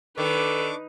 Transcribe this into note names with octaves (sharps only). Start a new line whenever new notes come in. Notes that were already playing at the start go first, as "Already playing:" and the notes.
D#3 D4 A4 B4 C#6 D6